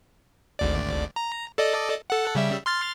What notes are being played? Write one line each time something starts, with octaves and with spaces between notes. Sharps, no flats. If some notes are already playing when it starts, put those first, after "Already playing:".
G#1 D2 D5
A#5
A4 D5 D#5
A4 F#5
C#3 G3 E5
C6 F6 A6